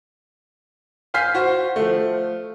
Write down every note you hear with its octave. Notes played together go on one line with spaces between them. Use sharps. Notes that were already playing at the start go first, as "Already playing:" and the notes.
F5 G#5 F6 G6 B6 C7
F#4 C5
F3 A3